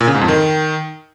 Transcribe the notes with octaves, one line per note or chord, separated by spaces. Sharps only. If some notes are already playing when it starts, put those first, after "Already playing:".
A#2
C#3
G#2
F2
D#3